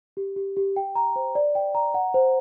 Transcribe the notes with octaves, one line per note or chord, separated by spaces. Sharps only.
G4
G4
G4
G5
A#5
C5
D5
G5
A#5
F#5
C5